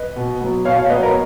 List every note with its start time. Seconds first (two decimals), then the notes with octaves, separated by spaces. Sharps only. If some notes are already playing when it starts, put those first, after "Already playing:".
Already playing: B4 D#5
0.16 B2
0.41 F#3 B3
0.65 B2 C#5 F5
0.78 C#5 F5
0.90 F#3 B3 B4 D#5
1.03 A#4 C#5